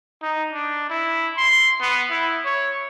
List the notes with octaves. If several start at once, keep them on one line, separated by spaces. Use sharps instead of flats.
D#4
D4
E4
C6
B3
E4
C#5